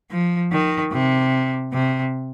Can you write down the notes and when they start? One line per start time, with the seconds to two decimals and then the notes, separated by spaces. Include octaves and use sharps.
0.11 F3
0.52 D#3
0.92 C3
1.73 C3